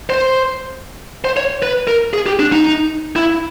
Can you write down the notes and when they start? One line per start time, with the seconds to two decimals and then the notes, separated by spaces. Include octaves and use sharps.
0.10 C5
1.25 C5
1.37 C#5
1.63 B4
1.87 A#4
2.13 G#4
2.26 G4
2.39 D4
2.52 D#4
3.16 E4